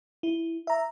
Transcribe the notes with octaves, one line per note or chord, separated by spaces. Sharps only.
E4
E5 A#5